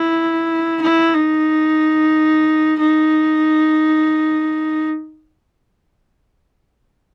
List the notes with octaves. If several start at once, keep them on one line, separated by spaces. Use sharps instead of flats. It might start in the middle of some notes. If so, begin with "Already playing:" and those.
Already playing: E4
E4
D#4
D#4